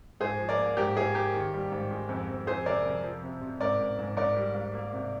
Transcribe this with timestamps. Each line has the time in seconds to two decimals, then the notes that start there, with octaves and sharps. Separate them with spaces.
0.20 G#2 G#4 C5
0.39 F3
0.49 A#4 D5
0.58 A#3
0.77 G#2 G4 A#4
0.97 G#2 G#4
1.14 A#3 G4 A#4
1.34 D#3
1.53 G3
1.72 G#2
1.91 G#3
2.09 F2
2.29 F2
2.47 F2 G#4 C5
2.66 C3 A#4 D5
2.85 F2
3.04 F3
3.23 C3
3.42 C3
3.60 G#2 A#4 D5
3.80 G#2
3.98 G#2
4.17 G#2 A#4 D5
4.36 G3
4.55 G#2
4.74 A#3
4.93 C3